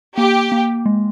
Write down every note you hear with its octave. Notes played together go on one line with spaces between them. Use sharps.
A#3 G4
A#3
G#3